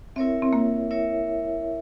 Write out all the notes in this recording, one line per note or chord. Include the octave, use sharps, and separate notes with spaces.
C4 E4 A#4 C#5 E5
C4
A#3
E4 A#4 C#5 E5